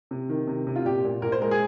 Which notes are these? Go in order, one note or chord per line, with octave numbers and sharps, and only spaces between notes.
C3
D#3
C3
C3
F4
A#2 G4
A#2
A#2 A#4
C5
G#3 A#4
G#4